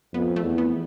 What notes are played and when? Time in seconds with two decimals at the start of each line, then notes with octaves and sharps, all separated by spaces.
0.13 F2 B3
0.36 A3
0.43 E2
0.58 B3